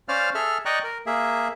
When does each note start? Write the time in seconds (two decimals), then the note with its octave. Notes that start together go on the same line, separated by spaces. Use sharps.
0.08 C#4 C5 D5 F5 F6
0.35 G#4 A4 E5 F6
0.65 D5 D#5 G5 A#5 C#6 F#6
0.84 A#4
1.06 A#3 G#4 E5